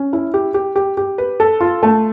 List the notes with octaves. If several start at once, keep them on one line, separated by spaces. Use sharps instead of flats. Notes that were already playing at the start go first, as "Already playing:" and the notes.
Already playing: C#4
E4
G4
G4
G4
G4
B4
A4
F4
A3